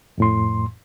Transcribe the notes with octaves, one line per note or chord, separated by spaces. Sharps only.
F2 A2 C6